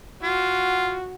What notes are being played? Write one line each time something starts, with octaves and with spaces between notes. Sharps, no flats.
F4 F#4